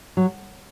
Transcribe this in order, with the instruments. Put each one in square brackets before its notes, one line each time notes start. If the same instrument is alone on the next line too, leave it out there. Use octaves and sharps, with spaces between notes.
[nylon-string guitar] F#3